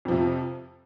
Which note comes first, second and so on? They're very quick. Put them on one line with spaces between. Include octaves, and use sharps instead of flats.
F2 F3 C3